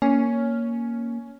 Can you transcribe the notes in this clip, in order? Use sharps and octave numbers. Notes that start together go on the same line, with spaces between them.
A#3 C#4